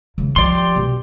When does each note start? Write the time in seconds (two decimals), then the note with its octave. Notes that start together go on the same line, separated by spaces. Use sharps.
0.18 C#3 E3
0.36 F3 G4 D5 C6
0.76 B2